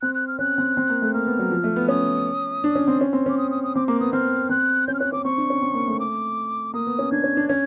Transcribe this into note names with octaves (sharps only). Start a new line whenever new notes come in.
C4 F#6
F#6
F6
C#4 F#6
C4
C4
A#3
A3
A#3 F6
B3
F#3
F3
A3
B3
C#4 D#6
D4
C#4
C4
C#4
C4
C#4 D6
D#6
D#6
D#6
C4 D6
A#3 D6
B3 D#6
C4 F6
C4 F#6
C#4 G6
F6
C#4 F#6
C#4 D6
C4 C#6
D4
C#4
C4
A#3
A3
D6
A#3 D#6
B3
C#4
D4 G#6
C#4
D4
C#4 G#6